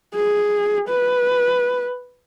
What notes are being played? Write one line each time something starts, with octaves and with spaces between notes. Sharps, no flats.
G#4
B4